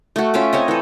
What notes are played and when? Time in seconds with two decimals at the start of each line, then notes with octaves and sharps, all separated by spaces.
0.16 A3 F#4
0.34 C#4 F4 E5 D6
0.53 C4 C#5 D#5
0.68 E3 A4